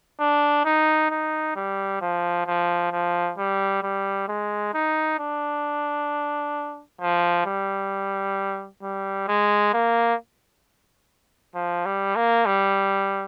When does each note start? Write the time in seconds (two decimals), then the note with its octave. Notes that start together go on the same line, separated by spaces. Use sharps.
0.20 D4
0.65 D#4
1.10 D#4
1.56 G3
2.01 F3
2.47 F3
2.92 F3
3.38 G3
3.83 G3
4.28 G#3
4.74 D#4
5.19 D4
7.01 F3
7.46 G3
8.83 G3
9.28 G#3
9.74 A#3
11.55 F3
11.86 G3
12.16 A#3
12.46 G3